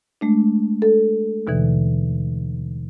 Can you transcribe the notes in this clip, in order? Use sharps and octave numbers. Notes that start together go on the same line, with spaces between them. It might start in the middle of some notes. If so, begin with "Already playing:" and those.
G#3 A3 D4
A4
D#2 B2 D3 E3